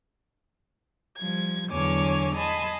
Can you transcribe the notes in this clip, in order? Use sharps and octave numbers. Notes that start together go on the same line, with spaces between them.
F3 G3 G#6
E2 D3 F#3 C#5 G#5 D6
D#5 G#5 A5 B5 C6